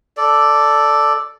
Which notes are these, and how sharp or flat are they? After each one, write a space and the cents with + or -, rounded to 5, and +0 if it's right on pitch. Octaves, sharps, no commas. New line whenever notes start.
A4 +0 D5 +0